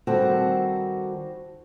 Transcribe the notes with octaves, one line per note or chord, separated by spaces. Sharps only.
D#3 G3 C4 F#4 A4